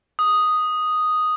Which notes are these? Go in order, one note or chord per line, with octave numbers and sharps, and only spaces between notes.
D#6